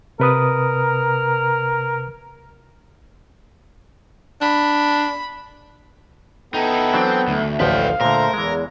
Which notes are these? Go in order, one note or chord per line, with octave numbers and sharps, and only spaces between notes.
C3 A#4 B4 D#6
D4 B5
B3 D#4 E4 A4 G5
E3 F#3 C4 D4
D2 A3
A1 D2 F3 B4 F5 G5
A#2 D3 A3 A4 A#4 C5
E2 E3 G#3